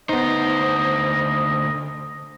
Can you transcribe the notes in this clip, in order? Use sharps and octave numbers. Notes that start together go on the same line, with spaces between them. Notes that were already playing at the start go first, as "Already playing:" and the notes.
D2 B3 D#4 C5 D#5